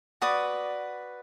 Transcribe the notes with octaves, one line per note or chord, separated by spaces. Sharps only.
F#4 B4 D5 D#6